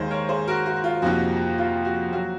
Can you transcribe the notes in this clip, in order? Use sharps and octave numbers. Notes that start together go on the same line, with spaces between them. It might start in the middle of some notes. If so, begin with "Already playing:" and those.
Already playing: D#2 D#3 G#3 D#4 G#4 C5
A#4 C#5
G#4 C5
F#4 A#4
F#4
F4
F2 C3 F3 A#3 D#4 F#4
F4
F#4
F#3 A#3 F#4